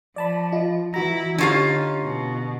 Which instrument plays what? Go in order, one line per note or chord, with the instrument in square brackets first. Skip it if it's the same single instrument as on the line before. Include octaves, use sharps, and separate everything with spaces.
[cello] F3 [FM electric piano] D5 A5 B5
[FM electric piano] F4 [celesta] D#5
[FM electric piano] E3 F#4 A#5 [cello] E4 [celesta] A#6
[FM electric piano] D3 [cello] C#4 [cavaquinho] D#4 F4 F5 [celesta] G4 C#6 G#6
[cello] B2